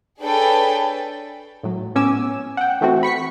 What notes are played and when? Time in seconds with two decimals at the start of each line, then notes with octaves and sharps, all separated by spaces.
0.20 D4 G#4 A4 B4 C#5 G5
1.63 A2 F#3
1.95 A2 B3 C#4 G#5 D6 E6
2.57 F#5 G5
2.81 E3 A3 C4 F#4
3.03 B5 C#6 B6 C#7